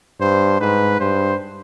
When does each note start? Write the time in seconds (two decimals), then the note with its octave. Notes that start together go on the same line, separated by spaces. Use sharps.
0.20 G2 C5
0.61 G#2 B4
1.00 G2 C5